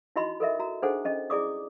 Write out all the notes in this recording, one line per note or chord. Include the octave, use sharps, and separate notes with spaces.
D#4 E4 F#4 D#5 B5 C6
A4 A#4 D#5 E5
F#4 A#5
D4 D#4 G#4 A4 C5 F#5
C#4 D#5
E4 G#4 D5 D6 D#6